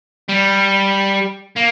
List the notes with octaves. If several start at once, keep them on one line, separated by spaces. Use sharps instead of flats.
G3
A#3